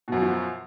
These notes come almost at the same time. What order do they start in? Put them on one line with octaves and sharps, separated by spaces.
B2 F#2 F#3 F3